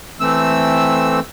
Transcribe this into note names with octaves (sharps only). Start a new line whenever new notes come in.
E3 A3 C4 E6